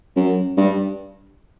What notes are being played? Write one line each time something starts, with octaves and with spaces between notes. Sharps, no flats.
F#2
G2